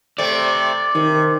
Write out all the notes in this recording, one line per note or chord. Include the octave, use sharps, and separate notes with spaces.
C3 A3 C4 D5
C3 D#3